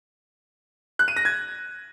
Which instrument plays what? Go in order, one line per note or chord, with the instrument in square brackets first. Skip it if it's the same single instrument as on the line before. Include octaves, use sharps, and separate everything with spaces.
[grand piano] F#6
D#7
A#6
G#6